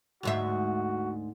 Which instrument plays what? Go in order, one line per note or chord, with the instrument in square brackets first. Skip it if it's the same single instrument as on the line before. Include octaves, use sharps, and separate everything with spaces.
[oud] D2 G#2 E5 [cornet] F#4